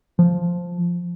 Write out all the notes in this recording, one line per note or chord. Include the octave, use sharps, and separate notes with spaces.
F3